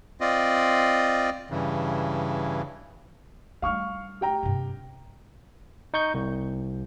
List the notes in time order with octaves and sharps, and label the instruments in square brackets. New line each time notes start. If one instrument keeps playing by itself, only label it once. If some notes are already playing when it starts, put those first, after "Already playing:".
[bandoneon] C4 F4 D5 D#5
G2 C#3 E3
[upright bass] G3 D4 [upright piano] F5 C#6 F6
[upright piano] G4 G5 A#5
[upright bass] G2 C3
[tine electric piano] D#4 C#6 G6
C2